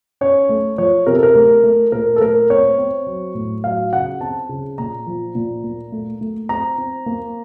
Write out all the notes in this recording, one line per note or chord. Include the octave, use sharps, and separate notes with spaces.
C#4 C#5
A3
F3 C#5
C3 A#4
A4
A#4
A3
A3
A#2 A#4
A4
A3 A#4
C4 C#5
C4
F#3
A2
F#3 F5
C#3 F#5
C4 A5
C#3
A#2 A#5
F3
A#2
A#3
A3
A3
C4 A#5
C4
A#3